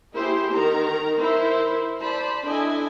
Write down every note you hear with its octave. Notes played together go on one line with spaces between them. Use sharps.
A#3 E4 G4 G#4 C5
D#3 D#4 A#4 A#5
E4 A#4 C5
C5 D5 A5 B5
D4 E4 A4 D#5 G#5